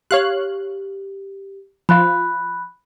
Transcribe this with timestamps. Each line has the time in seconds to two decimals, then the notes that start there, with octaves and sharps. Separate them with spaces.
0.11 G4 C#5 F5 F#6
1.89 F3 F4 B5 F#6